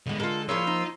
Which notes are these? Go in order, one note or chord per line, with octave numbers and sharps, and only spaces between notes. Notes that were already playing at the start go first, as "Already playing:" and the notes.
E2 D3 G#3 B3
D3 G#3 F4 A4 A#4
F3 A#3 E4 F4 G#4 C#5 C6 E6
D#4